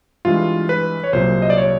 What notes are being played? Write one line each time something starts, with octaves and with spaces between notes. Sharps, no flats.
G2 E3 G#3 F4
B4
C#5
C2 A#2 F#3 C5
D#5
D5
C#5